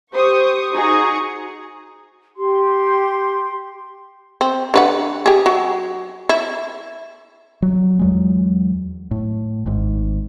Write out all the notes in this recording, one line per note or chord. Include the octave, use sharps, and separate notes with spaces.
G4 C5 C#6 D#6
D#4 F#4 G#4 A#5 C#6 D#6
G4 C6
C4
D3 B4 F#5
G4 G#4
F#3
E4
F#3
E2 F#3 G#3
A2
G#1 G#2